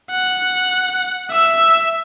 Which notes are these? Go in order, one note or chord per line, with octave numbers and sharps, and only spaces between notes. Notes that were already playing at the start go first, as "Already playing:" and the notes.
F#5
E5 E6